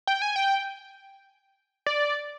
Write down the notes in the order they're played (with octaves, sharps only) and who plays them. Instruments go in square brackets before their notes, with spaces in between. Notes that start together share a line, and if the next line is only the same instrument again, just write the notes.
[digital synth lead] G5
G#5
G5
D5